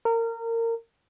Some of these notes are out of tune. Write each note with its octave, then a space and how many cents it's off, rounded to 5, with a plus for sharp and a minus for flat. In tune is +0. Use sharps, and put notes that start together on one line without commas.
A#4 -25